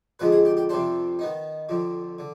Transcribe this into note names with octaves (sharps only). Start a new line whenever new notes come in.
F2 D3 F3 G#3 B3 B4
G#4
G4
G4
F2 C3 G3 D4 C5
D#3 B3 D#4
F2 D3 F3
D3